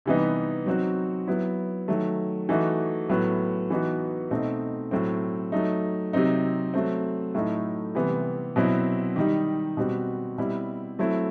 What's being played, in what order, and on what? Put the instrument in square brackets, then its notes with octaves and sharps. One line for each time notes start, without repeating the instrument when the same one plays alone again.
[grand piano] C3 E3 G3 B3 D#4
F#3 C4 D#4 F#4
F#3 B3 E4
D#3 F#3 A3
E3 A3 D#4 F#4
A2 F#3 B3
E3 B3 D#4 F#4
B2 A3 C4 D#4
A2 F#3 C4
F#3 A3 D#4
C3 F#3 C4 D#4
F#3 A3 C4
A2 F#3 A3 D#4
C3 E3 G3 B3
B2 F#3 C4 E4
D#3 G3 D#4
B2 G3 C4 F#4
B2 G3 C4 E4
F#3 A3 C4 E4